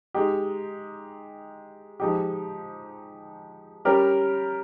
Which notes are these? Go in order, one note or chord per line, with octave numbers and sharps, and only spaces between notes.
G#3 D#4 G4
F3 G#3 D#4 G4
G3 C#4 G4 A#4